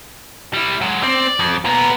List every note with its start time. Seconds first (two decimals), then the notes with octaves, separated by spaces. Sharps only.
0.54 G3 E4
0.82 F#3 G#3
1.03 C4 D5
1.39 F2
1.65 A#2 B3 B4 A#5